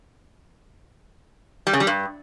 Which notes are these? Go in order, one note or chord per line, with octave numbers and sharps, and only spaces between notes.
G3
C#3
G3
G2